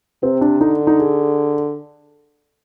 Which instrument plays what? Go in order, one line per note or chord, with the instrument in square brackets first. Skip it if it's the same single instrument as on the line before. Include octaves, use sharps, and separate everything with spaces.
[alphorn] C3 [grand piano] C4
[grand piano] D4
[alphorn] D3 [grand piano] D#4
[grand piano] D#4
G#4